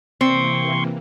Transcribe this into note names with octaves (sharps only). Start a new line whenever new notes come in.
C3 E3 A#3 C4 C6 C#6